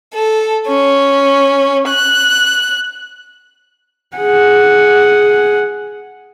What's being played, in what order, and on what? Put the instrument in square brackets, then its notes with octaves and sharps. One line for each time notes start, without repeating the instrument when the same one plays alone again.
[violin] A4
C#4
F#6
[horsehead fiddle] G#4 F#5